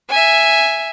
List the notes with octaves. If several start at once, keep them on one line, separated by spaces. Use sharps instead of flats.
E5 G#5